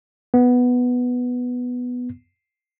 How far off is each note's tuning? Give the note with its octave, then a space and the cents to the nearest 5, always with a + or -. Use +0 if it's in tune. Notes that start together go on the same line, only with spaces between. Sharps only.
B3 +0